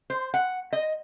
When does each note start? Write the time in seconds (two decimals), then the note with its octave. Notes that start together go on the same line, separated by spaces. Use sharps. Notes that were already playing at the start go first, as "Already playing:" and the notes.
0.10 C5
0.34 F#5
0.73 D#5